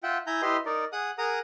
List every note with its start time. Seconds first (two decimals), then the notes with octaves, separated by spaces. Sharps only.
0.03 F4 E5 F#5 G5
0.27 E4 G#5 A#5 G6
0.42 E4 G4 B4 D#5 C6
0.66 D#4 A#4 D5
0.93 G#4 F#5 D#6 F#6
1.18 G#4 A#4 F#5 A#5 D#6